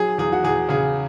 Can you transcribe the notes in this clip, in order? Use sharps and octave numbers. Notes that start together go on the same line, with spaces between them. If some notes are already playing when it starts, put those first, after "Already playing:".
Already playing: F#3 G#4
E2 G#4
F#4
E2 G#4
C#3 G#4